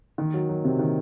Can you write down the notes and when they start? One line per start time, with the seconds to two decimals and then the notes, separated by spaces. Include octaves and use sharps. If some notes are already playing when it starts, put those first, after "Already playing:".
0.18 D#3
0.34 F#3
0.49 F#3
0.64 C3
0.79 D#3